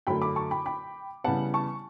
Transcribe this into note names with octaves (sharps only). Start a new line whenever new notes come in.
F#2 D3 A3 G5 B5
B5 D6
A5 C#6
G5 B5
G5 B5
C#3 E3 G3 B3 F#5 A5
A5 C#6